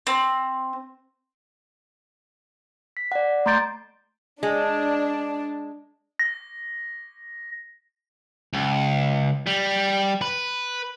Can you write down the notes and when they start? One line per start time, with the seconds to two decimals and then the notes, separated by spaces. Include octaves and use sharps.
0.07 C4
2.97 B6
3.12 D5 F#5
3.46 A3 A#5 C6 G6 A6 D7
4.43 G#3 D4
6.19 A#6
8.53 C#2
9.47 G3
10.22 B4